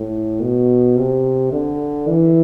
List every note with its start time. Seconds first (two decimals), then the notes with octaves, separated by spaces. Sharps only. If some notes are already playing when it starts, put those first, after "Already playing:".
Already playing: A2
0.41 B2
0.97 C3
1.52 D3
2.09 E3